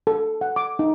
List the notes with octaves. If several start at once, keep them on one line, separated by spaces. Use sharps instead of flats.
A4
F#5
D6
D#4